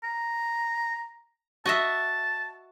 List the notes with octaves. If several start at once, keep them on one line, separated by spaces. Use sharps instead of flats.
A#5
F#4 D#5 E5 A5